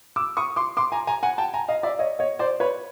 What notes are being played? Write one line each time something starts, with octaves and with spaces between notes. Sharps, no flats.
D6 E6
C#6 D#6
C6 D6
C6 D6
G#5 A#5
G#5 A#5
F#5 G#5
G5 A5
G#5 A#5
D#5 F5
D5 E5
C#5 D#5
C#5 D#5
C5 D5
B4 C#5